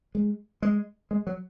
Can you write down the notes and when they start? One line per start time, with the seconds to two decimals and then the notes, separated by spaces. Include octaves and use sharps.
0.15 G#3
0.62 G#3
1.11 G#3
1.27 F#3